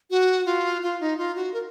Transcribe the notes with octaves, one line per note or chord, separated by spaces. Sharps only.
F#4
F4
F4
D#4
F4
F#4
A#4